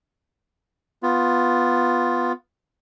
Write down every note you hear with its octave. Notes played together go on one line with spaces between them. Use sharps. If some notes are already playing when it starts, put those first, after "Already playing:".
B3 F4